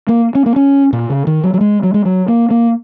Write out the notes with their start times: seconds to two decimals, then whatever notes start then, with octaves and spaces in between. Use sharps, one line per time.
0.08 A#3
0.35 C#4
0.46 A#3
0.56 C#4
0.93 A#2
1.10 C#3
1.27 D#3
1.44 F#3
1.54 F#3
1.61 G#3
1.83 F#3
1.94 G#3
2.05 F#3
2.28 A#3
2.51 A#3